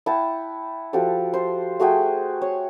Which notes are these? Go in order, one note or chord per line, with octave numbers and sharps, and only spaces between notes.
E4 F#5 G5 A5
F3 F#4 G4 A4
C5
A3 F#4 G#4 G5
C#5